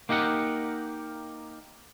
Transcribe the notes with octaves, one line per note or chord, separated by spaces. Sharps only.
A#3 D#4 G4 A#4 F#5